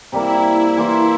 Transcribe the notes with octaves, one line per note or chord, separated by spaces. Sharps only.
C3 G3 A#3 E4
E4
E3 A#3 F4